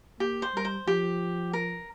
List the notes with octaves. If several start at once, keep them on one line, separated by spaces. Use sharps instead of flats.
A#3 G4
C5
G3 A#4
C5
F3 G4
A#4